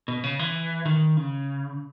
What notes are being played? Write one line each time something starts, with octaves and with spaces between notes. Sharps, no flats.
B2
C#3
E3
D#3
C#3